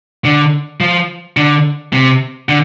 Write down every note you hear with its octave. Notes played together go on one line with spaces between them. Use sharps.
D3
F3
D3
C3
D3